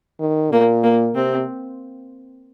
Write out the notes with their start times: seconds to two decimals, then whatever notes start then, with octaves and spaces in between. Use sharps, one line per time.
0.20 D#3
0.52 A#2 A#3
0.83 A#3
1.15 C3 C4